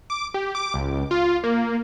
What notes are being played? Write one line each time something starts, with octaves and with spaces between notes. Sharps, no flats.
D6
G4
D6
C#2
F4
A#3